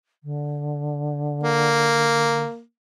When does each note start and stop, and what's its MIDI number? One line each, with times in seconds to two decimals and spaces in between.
0.23 2.43 50
1.43 2.60 58